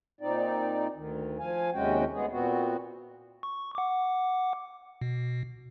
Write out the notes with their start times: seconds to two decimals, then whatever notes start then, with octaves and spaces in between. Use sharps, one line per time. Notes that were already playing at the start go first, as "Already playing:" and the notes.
0.21 A#2 C4 D#4 D5
0.96 D2 D#3
1.39 F3 F5 G#5
1.74 D#2 C3 G#3 C#4 F#4 G5
2.14 D2 G#3 B3 G#4
2.32 A#2 B3 C4 F#4
3.43 C#6
3.75 F#5 D6
5.01 B2